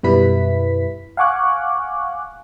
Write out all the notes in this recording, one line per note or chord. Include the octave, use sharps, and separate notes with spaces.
F#2 B2 G3 E4 B4 B6
F5 F#5 G#5 C#6 D6 F#6